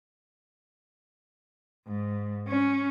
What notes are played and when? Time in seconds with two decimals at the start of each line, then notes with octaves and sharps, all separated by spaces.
1.87 G#2
2.48 C#4